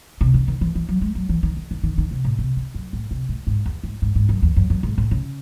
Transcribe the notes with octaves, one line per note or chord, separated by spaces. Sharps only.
C3
C#3
D#3
E3
E3
F#3
G#3
F#3
E3
D#3
D#3
D#3
D#3
D#3
C3
A2
C3
C#3
F#2
A2
C3
A2
G#2
E2
G#2
G#2
G#2
F#2
E2
F#2
F#2
G#2
A2
C#3